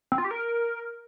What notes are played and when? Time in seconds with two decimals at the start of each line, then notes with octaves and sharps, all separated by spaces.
0.12 C4
0.18 F4
0.24 G4
0.31 A#4